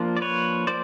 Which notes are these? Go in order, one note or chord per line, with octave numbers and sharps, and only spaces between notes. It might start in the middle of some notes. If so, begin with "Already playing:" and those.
Already playing: F3 A#3 D4 F4
D5
B4 C#5
F3 A#3 C5 D5